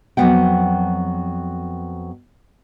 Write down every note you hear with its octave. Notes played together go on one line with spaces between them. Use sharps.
F2 F#3 A#3 B3 F#5 G5